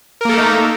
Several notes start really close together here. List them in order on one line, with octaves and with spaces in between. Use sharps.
A#4 A#3 A4 A3 D#4